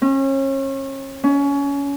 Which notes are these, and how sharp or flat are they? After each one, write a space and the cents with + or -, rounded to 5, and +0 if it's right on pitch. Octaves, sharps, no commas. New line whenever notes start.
C#4 -35
C#4 +25